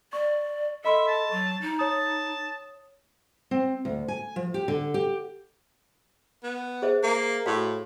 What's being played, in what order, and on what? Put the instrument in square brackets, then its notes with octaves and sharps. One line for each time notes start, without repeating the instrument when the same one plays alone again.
[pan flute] D5 [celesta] C#6
[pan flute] A4 [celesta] D#5 B5 C6 [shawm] E5
[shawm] A5
[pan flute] F#3 [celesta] C#6
[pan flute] D#4
[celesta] C#5 D#6 [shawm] A5
[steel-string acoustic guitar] C4
D2
G#5
F3
G4
D3
G4
[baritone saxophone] B3
[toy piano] G#4 C5 E5
[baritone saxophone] A#3
[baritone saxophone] A2 [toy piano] F#4 F5